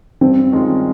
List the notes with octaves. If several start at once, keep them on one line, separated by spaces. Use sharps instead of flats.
G2 C4
D#3 G#3 C#4 F4